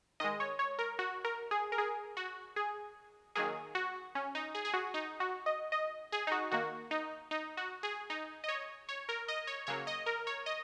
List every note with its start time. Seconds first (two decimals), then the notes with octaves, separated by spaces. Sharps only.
0.20 D#3 G#3 D#5
0.40 C#5
0.59 C#5
0.79 A#4
0.99 F#4
1.25 A#4
1.51 G#4
1.72 A#4
1.78 G#4
2.17 F#4
2.56 G#4
3.35 D#3 F#3 A#3 G#4
3.75 F#4
4.15 C#4
4.35 D#4
4.55 G#4
4.65 G#4
4.74 F#4
4.94 D#4
5.20 F#4
5.46 D#5
5.72 D#5
6.12 G#4
6.27 D#4
6.32 F#4
6.51 D#3 A#3 F#4
6.91 D#4
7.31 D#4
7.57 F#4
7.83 G#4
8.10 D#4
8.44 D#5
8.48 C#5
8.89 C#5
9.09 A#4
9.28 D#5
9.47 C#5
9.67 C#3 F#3 A#3 C#5
9.87 D#5
10.06 A#4
10.27 C#5
10.46 D#5